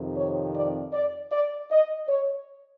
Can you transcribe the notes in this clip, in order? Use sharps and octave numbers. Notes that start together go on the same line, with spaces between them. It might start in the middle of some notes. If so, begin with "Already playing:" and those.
Already playing: F2 C3 D#3
C#5
D5
D5
D5
D#5
C#5